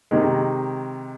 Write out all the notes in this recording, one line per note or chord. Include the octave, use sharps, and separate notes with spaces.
C3 D#3 G#3